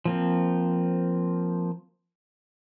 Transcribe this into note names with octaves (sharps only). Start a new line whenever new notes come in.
F3 A#3 C4